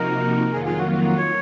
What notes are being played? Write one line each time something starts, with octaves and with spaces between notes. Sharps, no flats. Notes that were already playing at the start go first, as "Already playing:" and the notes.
Already playing: C3 F3 A#3 D#4 F#4 A#4
F2 D#3 F#3 A#3 F4 G#4
G#4
F#4
F#4
F#4
C#5